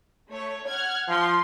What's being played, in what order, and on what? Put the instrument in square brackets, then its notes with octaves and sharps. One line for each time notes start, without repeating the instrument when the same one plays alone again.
[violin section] A3 C#5
F#5 F6 G#6
[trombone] F3 [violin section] C6